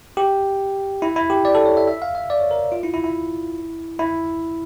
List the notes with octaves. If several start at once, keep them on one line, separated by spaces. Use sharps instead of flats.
G4
E4
E4
G4
D5
A4
C#5
E5
E5
F5
E5
D5
C#5
A#4
F4
E4
E4
E4
E4